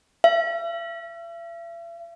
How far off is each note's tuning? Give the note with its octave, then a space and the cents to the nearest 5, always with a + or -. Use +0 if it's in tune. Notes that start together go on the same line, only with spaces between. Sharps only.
E5 +45